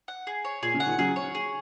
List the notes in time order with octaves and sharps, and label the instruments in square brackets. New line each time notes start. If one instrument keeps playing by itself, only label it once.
[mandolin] F#5
G#4
C#5
[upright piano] A#2 [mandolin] G#4
[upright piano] C#3
[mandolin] F#5
[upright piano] A#2 D#3
[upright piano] C#3 F#3 [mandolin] G#4
[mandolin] C#5
G#4